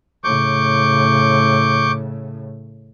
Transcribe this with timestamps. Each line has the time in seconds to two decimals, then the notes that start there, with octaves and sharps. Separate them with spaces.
0.24 A2 C#3 C#6 D6 G6